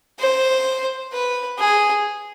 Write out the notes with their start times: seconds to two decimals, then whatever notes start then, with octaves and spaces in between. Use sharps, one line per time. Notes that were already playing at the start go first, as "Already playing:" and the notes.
0.20 C5
1.12 B4
1.59 G#4